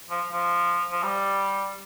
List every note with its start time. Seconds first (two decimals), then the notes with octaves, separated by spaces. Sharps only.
0.10 F3
0.32 F3
0.92 F3
1.03 G3